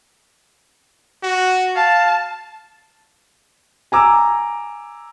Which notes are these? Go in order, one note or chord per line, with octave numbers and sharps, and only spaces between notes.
F#4
F5 A5
G#5 A#5 D6 E6